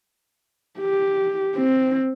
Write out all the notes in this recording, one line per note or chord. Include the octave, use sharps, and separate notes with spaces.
G4
C4